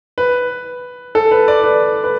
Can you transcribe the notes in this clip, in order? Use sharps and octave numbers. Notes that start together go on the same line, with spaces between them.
B4
A4
B4
D5
B4
B4